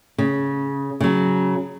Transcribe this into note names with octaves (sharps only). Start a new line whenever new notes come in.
C#3
C#3 F#3